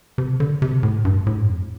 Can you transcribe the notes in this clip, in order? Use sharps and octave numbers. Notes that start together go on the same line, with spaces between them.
C3
D3
C3
A2
G2
A2
G2
F2